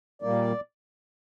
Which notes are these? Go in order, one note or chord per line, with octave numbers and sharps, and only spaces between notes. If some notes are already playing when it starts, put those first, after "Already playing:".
A#2 G3 A#3 D5